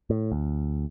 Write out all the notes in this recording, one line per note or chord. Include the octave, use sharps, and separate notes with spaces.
A2
D2